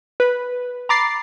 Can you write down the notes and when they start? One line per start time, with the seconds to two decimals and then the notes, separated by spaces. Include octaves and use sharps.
0.20 B4
0.89 A#5 B5 D6 A6 C7